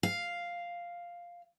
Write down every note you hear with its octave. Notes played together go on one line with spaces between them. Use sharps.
F5